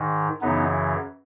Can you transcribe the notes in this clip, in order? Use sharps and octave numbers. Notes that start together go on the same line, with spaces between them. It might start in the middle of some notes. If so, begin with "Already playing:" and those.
Already playing: G#2 D#3
F#2 C#3 E3 B3 D#4